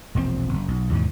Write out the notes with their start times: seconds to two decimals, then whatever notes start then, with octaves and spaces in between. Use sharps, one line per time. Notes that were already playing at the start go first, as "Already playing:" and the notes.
0.15 E1 A#1 A2 C4
0.53 F#1
0.68 B1
0.91 D#2 G#2 B2 E3